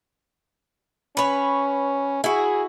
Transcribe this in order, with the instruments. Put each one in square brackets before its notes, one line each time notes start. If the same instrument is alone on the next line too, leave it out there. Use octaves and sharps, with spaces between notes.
[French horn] C#4 [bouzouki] B4 C#5
[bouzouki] E4 F#4 [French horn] G#4